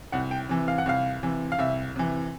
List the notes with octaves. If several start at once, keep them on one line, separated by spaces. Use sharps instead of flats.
C2 F#5
G5
C3 E3
F5
F#5
C2 F5
C3 E3
F5
C2 E5
C3 E3